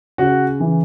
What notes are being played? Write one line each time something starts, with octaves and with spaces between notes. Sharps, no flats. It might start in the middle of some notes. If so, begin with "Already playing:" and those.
C#3 F#4
E3